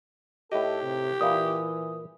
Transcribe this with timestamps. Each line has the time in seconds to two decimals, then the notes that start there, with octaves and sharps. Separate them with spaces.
0.52 A2 G4 A4 D#5
0.82 C3
1.21 A#2 E3 E4 F5 D#6